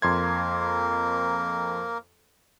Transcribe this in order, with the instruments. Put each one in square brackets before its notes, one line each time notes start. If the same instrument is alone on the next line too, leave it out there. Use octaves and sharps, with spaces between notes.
[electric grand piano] F2 C6 G#6 [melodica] A#3 A#4